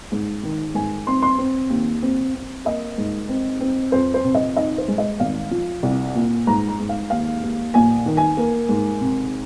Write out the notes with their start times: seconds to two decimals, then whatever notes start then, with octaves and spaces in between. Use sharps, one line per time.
0.12 G#2
0.43 D#3
0.74 G#2 G#5
1.07 C4 C6
1.22 C6
1.38 C4
1.70 D#2
2.02 C4
2.34 C4
2.65 A#3 D#5
2.98 G#2
3.29 C4
3.61 C4
3.92 F2 C5
4.14 C5
4.24 C3
4.35 D#5
4.56 D#4 D#5
4.78 C5
4.88 G#3
4.98 D#5
5.20 G#1 F5
5.51 F3
5.83 C2
6.15 A#2
6.47 G#2 A#5
6.68 A#5
6.79 G#2
6.89 F5
7.10 D#2 F5
7.43 D#2
7.74 A#1 G#5
8.06 D#3
8.17 G#5
8.37 A#3
8.69 G#2
9.01 C3